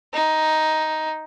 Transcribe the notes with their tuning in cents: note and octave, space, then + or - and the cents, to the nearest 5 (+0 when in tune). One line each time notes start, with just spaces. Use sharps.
D#4 +5